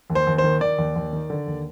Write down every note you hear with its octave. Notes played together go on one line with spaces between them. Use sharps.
D#2
C5
D#2
C5
D#3
D#3 D5
D#2
D#2
D#3
D3
D#2